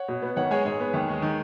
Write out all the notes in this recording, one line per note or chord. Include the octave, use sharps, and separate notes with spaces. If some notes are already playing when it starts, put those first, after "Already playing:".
Already playing: C#5 F#5
B2
B3
G#1 C#5 F#5
G#3 G#4 C#5
G#2 G#4 C#5
B3
D#2
G#3
D#3